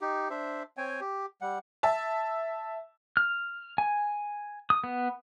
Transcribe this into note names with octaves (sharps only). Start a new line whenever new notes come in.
D#4 G4
D4 C5 E5
C4 C#5 G5 G#5
G4
G3 F#5
E5 A5
F6
G#5
D#6
B3